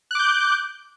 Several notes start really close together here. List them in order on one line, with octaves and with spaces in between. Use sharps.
F#6 D6 G6